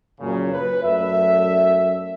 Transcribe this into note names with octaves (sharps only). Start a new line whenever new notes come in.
F#2 A#2 C#3
B4
F#2 A3 D5 E5